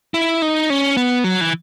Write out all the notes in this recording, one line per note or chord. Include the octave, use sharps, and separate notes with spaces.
E4
D#4
C#4
B3
F#3
E3